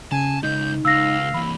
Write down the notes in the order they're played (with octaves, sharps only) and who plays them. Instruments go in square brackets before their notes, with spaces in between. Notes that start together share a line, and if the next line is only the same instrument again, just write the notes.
[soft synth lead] C#3 [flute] G#5 [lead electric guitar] A5
[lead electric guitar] C#3 G#3 [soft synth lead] D#4 [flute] G6
[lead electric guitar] C#2 [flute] F5 [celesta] E6 A#6
[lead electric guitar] E3 A#3 [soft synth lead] B5